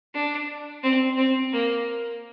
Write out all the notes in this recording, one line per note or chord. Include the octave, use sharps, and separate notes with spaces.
D4
C4
C4
A#3